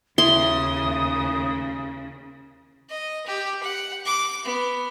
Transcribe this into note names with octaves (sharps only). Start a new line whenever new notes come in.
D#2 C#3 E4 C6 D#6
D#5
G4
F#5
D6
B3